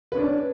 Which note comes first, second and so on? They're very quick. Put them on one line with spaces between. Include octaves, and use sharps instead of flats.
B4 C#4 D4